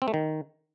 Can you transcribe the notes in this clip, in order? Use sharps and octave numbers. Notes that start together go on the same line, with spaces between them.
C4
A3
D#3